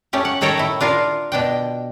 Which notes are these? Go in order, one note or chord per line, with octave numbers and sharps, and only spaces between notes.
A3 C#4 G4
F#5
A2 D#3 A4 C#5 G5 A#5
A3 E4
D4 F4 A#4 F5
B2 D4 G5